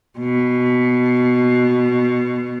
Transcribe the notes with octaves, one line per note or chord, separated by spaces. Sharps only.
B2